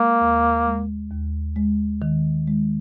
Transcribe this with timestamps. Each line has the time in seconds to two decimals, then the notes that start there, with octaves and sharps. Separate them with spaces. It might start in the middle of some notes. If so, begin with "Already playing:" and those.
Already playing: G#3 A#3
0.21 D#2
0.66 G#3
1.11 D#2
1.56 G#3
2.02 D#3
2.47 G#3